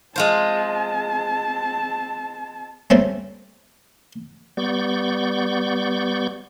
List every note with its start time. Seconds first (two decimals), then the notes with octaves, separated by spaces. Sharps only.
0.16 G#3 C4 F4 C5 A5
2.90 G3 A3 C4 C#4
4.57 G3 B3 D5 C#6 G6